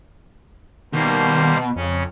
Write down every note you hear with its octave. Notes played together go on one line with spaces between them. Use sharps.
B2 D#3 G3 A#3 C5
F2 C#3 C#4